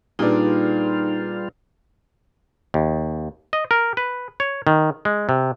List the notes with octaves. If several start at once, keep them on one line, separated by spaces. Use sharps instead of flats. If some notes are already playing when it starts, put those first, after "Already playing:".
A#2 G3 D4 D#4 F4 G4 G#4 B4
D#2
D#5
A#4
B4
C#5
D#3
G#3
C3